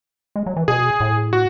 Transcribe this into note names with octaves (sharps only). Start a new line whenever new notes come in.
G#3
F#3
E3
B2 G#4
A2
F#4